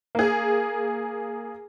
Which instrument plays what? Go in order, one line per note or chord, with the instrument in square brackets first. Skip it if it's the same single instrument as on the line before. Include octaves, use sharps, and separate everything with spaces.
[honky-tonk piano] A#3 G#4